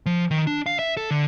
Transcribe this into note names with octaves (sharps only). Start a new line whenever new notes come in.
F3
D#3
D4
F5
E5
A4
D3